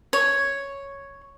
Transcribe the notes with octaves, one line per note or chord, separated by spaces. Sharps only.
C#5